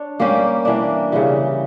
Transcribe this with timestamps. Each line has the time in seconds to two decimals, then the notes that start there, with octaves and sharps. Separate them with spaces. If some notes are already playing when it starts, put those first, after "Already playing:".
Already playing: D4 C#5
0.20 G3 A#3 C#4 G4
0.65 E3 A#3 D4
1.12 C#3 E3 G3